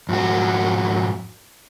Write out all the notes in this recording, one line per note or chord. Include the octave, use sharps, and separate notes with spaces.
F2 G#2 F#4